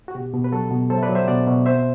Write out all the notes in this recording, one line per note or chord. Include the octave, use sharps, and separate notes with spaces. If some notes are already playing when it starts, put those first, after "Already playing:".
F#4
B2 G4
B2
B4
F#3 F#4 A4
B2
F#3 A4 C5
E5
B4 D5
F#3
C5 E5
B2 D5 F#5
B2
C4 C5 E5